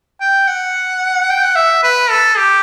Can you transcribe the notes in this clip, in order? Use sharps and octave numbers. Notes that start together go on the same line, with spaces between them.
G5
F#5
G5
F#5
E5
B4
A4
G4